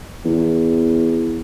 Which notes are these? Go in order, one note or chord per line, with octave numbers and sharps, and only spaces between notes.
E2